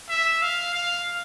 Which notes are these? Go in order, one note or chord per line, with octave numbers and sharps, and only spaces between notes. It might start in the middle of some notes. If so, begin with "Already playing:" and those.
E5
F5
F5